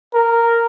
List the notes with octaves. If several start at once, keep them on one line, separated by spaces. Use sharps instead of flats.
A#4